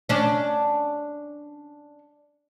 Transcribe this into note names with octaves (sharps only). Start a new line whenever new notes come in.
C#4 D4